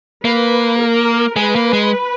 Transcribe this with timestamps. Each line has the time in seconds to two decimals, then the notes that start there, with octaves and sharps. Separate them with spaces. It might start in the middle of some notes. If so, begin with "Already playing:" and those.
0.24 A#3 B4
0.81 A#4
1.36 G#3 B4
1.55 A#3
1.73 G#3